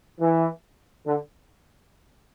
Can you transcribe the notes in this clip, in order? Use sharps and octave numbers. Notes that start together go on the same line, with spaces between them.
E3
D3